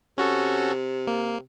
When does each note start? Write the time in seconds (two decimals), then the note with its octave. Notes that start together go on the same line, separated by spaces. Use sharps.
0.18 C3 C#4 F#4 A4
1.07 A#3